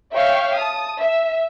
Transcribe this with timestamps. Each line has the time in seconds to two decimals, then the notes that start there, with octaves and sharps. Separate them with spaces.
0.13 C#5 E5 F5 G5 C#6
0.56 A5 D#6
1.00 E5